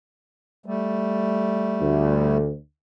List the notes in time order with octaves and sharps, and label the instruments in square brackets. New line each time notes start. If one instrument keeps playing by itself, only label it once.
[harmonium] G3 A3
[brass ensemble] D2